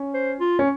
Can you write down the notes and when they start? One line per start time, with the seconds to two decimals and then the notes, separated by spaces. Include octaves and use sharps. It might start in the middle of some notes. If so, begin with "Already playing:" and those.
Already playing: C#4
0.14 C5
0.40 F4
0.59 C#4